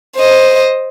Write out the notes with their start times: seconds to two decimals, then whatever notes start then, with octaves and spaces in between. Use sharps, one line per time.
0.17 C5 D#5